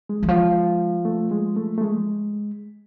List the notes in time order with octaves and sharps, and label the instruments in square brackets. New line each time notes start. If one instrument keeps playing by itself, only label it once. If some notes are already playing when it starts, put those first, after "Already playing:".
[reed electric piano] G#3
[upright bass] E3
F3
[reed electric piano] A3
G#3
A3
A3
G#3